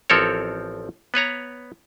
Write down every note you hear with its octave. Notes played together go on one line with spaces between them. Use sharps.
A1 F3 C4 A4 A#4 C#5
B3 B4 C#5 A#5